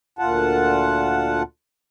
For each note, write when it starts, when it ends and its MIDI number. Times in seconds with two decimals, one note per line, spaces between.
0.19 1.43 38
0.19 1.43 46
0.19 1.43 65
0.19 1.43 78
0.19 1.43 81